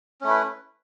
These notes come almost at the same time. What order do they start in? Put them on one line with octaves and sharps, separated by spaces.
C#4 A3 E4 B4